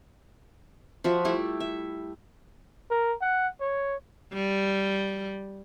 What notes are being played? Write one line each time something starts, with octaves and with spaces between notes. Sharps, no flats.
F3 F#4 E5
G3 A3 E4 G4
E5
A#4
F#5
C#5
G3